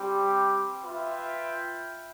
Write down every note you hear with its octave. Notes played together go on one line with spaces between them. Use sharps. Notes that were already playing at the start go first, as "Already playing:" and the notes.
Already playing: G3 C4 G4
F4 B4 E5 G5